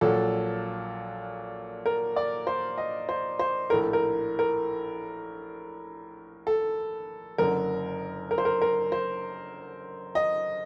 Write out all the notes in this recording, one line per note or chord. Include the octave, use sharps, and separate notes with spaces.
A#1 A#2 F#3 A4
A#4
D5
C5
D#5
C5
C5
A#1 A2 A3 A#4
A#4
A#4
A4
F#1 F#2 D3 A#4
A#4
C5
A#4
A#4
C5
D#5